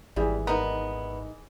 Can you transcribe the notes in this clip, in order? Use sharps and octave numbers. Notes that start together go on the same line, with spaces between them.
G#1 E3 G3 G#4
B3 D#4 A#4